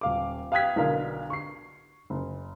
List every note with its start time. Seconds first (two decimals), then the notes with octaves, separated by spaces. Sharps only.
0.01 D#1 F5 D6
0.52 F5 G5 D#6 F#6 G#6 B6
0.76 B1 D3 A#4 F5
1.30 C#6 C7
2.10 F#1